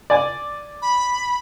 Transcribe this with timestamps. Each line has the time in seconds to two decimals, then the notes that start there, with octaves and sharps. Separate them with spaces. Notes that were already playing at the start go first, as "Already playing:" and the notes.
0.10 D5 G#5
0.82 B5